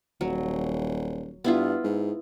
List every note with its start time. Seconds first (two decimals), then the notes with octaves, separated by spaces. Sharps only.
0.21 D#1 F#3
1.44 G2 B3 E4 F4
1.84 G#2